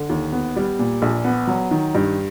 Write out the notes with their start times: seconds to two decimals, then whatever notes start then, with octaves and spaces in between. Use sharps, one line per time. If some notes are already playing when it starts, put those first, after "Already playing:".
Already playing: D3
0.09 D#2
0.32 B3
0.56 G3
0.79 A#2
1.02 A#1
1.24 B3
1.47 F#3
1.71 D#3
1.95 G2